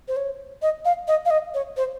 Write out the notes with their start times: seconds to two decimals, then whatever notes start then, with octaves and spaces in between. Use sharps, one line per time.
0.08 C5
0.16 C#5
0.62 D#5
0.85 F5
1.08 D#5
1.25 F5
1.30 D#5
1.54 C#5
1.77 C5